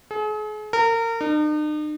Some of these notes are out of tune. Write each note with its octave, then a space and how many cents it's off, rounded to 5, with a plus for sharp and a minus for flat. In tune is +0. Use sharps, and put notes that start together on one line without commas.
G#4 +40
A#4 -30
D#4 -45